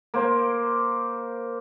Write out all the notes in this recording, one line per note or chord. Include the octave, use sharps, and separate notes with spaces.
A#3 C5